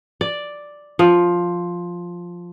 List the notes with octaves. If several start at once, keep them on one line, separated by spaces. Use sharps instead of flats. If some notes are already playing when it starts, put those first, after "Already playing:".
D5
F3